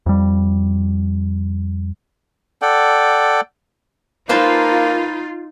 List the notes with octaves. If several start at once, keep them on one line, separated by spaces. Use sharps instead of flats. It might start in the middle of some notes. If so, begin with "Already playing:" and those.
F2 G3
A4 D5 F#5 G5
A#3 D#4 F4 B4 C5 A5